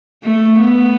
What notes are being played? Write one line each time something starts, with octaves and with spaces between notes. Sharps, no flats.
A3
B3